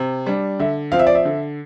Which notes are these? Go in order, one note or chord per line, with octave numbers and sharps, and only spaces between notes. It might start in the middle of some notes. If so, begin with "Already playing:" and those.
Already playing: C3
G3 D4
D3 E5
F3 C4 F5
E5
D5
E5
D3